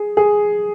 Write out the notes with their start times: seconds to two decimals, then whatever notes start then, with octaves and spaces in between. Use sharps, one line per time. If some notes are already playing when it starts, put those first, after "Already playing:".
Already playing: G#4
0.17 G#4